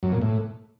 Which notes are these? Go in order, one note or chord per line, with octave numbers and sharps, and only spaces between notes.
F#2
A#2
A2